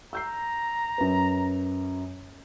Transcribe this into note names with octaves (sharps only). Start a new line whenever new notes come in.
A#5 E6 G6 C7
F#2 B4